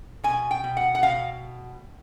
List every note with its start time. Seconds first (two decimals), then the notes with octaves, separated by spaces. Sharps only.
0.24 B2 G#5
0.51 G5
0.64 B2
0.77 F#5
0.95 F#5
1.03 B2 F5